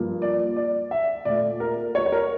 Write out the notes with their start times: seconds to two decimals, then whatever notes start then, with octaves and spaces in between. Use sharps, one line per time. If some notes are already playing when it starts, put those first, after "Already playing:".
Already playing: G2 F3 A#3
0.22 D5
0.56 D5
0.91 E5
1.25 A#2 A3 D5
1.60 A#4
1.95 C#5
2.06 C#5
2.12 A#4